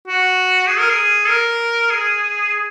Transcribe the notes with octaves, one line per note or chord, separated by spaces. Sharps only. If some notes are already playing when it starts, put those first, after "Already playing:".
F#4
G#4
A#4
G#4
A#4
G#4